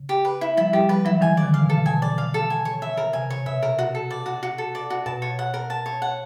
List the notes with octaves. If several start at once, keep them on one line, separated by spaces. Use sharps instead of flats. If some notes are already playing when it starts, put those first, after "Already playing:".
Already playing: C#3
G4
B4
E4
F3 G3 E4
F3 G3 G4
F3 G3 B4
E3 F#3 E4
D#3 F3 G#5
D5
D3 E3
F5
B2
A4
B2 G#5
D5
F5
A4
G#5
C#5
E5
A#4
C3 G#5
C#5
B2 E5
A#4
F#4
A4
D5
F#4
F#4
A4
D5
F#4
B2 A5
C#5
F#5
A#4
A5
C#5
F#5